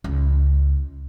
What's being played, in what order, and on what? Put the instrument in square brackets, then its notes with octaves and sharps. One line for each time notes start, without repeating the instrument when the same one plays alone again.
[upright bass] C#2